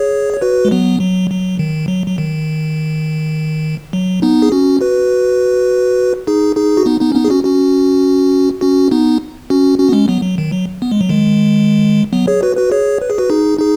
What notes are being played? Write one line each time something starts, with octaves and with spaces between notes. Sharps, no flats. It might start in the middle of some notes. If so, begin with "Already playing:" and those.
Already playing: G#4 C#5
C#5
F#4 B4
G#3
F#3 B3
F#3
F#3
D#3
F#3
F#3
D#3
F#3
B3 D#4
G#4
C#4 F#4
F#4 B4
D#4 G#4
D#4 G#4
F#4
B3 D#4
B3 D#4
C#4
B3 D#4
G#4
C#4 F#4
C#4 F#4
C#4 F#4
B3 D#4
C#4 F#4
C#4 F#4
B3
G#3 C#4
F#3 B3
F#3
D#3
F#3
B3
G#3
F#3
D#3 G#3
F#3 B3
G#4 C#5
F#4 B4
F#4 B4
G#4 C#5
B4
G#4
F#4 B4
D#4 G#4
D#4 G#4